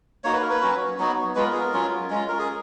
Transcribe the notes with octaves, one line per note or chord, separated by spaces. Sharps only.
A#3 D#4 F#4 C#5
B4
A#4
B4
F#3 C#4 F#4
F#3 B3 D#4 F#4
G#3 B3 F4 B4
A#4
G#4
A#4
F#3 C#4 F4
G#3 C#4 F4
A#4
G#4